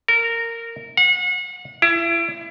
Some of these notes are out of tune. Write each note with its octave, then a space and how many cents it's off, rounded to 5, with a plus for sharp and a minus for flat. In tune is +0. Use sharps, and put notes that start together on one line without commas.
A#4 -15
F#5 -35
E4 +30